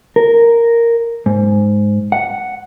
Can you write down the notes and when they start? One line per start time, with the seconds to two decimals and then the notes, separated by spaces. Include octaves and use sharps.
0.16 A#4
1.26 G#2
2.12 F#5